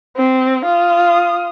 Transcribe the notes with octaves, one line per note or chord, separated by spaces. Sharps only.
C4
F4 D#6